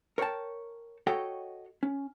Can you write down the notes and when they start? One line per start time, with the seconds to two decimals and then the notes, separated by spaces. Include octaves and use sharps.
0.18 A#4 C#5 D5 G5 A5
1.07 F#4 A4 C#5 D#5 F#5 G5
1.83 C#4